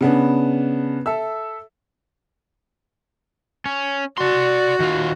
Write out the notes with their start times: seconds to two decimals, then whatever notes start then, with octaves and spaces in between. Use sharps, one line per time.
0.01 C#3 B3 D4
1.06 A4 E5 E6
3.66 C#4
4.18 F#4 D5 C6
4.80 D#3 F4